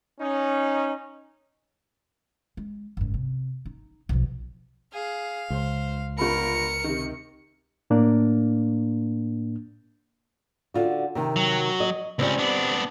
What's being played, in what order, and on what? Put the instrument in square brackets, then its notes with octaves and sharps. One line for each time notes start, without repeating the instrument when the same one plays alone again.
[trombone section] C#4 D#4
[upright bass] G#3
F#1 G#2
C3
D#4
B1 F3
[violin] G#4 [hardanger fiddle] F5
[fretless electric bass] C#2 [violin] C5
[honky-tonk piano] G1 F4 B5 [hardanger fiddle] A#4 [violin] C#7
[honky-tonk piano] C3 D#3
[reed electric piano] A2 A#3 D4
[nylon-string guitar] D3 F4 F#4
C3 D#3
[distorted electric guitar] F#3
[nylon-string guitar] D#5
[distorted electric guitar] C#2 C#4 [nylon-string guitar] G3 C4
[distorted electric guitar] B3 D4